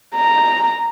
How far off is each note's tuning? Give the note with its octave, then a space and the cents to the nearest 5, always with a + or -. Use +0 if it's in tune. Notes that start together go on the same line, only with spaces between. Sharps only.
A#5 -5